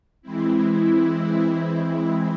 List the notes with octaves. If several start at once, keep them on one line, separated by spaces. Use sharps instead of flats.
E3 G#3 C4 E4